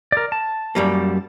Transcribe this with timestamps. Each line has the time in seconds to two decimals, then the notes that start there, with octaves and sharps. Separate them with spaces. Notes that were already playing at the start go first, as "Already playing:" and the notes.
0.12 A#4 D5
0.32 A5
0.75 F#2 G3 A#3